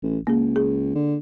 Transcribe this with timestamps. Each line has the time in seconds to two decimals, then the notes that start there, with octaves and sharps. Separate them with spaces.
0.03 A1
0.27 C#2 A#3 G#4
0.56 G#4
0.95 D3